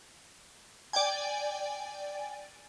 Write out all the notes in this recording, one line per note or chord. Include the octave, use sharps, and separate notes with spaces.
D5 G5 G#5